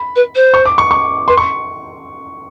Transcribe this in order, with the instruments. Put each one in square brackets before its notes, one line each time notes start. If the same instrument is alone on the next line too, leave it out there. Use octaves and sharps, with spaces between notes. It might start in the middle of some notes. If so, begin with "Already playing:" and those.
Already playing: [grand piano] B5
[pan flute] B4
C5
[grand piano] C#6
D6
C#6
C#6
[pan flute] B4 [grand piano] C6
[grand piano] C#6